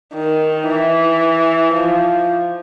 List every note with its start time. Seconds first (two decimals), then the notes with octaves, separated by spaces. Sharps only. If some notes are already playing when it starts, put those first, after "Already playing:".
0.14 D#3
0.68 E3
1.74 F3